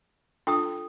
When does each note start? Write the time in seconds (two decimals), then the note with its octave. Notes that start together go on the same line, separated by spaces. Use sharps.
0.47 D4 F4 A4 G5 D#6